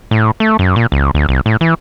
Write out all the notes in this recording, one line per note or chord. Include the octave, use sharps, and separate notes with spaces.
A2
A3
F#2
A#2
C#2
D2
C2
A2
E3